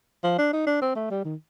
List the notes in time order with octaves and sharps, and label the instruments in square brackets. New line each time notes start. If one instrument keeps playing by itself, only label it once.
[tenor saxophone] F3
D4
D#4
D4
C4
A3
G3
D#3